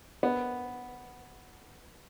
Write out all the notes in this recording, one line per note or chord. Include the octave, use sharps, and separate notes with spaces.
B3